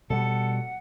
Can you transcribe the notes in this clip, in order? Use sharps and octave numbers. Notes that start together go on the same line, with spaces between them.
B2 G3 A4 F#5